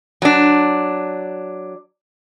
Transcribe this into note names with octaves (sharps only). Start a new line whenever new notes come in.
F#3 D4